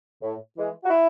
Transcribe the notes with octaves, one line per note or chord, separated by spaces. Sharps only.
A2
E3 G#3
F#4
E4